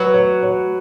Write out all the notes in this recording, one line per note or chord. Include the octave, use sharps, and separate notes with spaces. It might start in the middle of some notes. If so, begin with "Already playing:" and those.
Already playing: F#3 B4
C#5
C#5